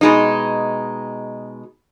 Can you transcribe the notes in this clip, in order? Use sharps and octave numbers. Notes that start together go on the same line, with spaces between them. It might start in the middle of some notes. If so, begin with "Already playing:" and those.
B2 G#3 D#4